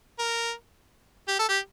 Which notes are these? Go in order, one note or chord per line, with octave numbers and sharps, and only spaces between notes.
A#4
G4
A4
G4